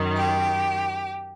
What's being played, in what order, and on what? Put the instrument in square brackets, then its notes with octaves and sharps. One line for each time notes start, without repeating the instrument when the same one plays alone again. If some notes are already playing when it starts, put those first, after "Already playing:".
Already playing: [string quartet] F#2 D#3
G4